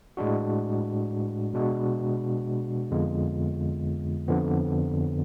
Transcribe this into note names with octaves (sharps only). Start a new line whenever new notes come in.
A2 G#3 D4 F#4
B2 G#3 D4 F#4
F2 D3 G#3 B3 F4
F2 D3 F3 B3